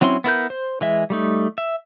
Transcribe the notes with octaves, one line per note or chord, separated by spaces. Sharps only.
F#3 C4 C#4 E4 C6
B3 E4 A#4 G6
C5
E3 G#3 E5
G3 A3 D#4
E5